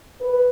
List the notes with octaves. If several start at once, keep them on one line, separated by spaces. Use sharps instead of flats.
B4